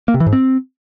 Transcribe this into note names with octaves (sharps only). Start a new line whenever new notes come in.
A#3
C3
E3
G#2
C4